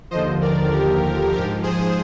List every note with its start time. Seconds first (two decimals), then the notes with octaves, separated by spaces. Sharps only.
0.11 D#2 D3 F3 C5 D#5
0.41 A#4 D5
0.71 D#2 D3 F3 G4 A#4
1.32 F3 G4 A#4
1.37 G#2
1.63 G#4 C5